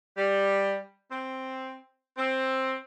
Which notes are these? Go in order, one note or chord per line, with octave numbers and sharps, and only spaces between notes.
G3
C4
C4